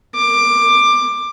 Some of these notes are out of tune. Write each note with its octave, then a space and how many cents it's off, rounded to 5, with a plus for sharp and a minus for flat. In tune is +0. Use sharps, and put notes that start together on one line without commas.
D6 +15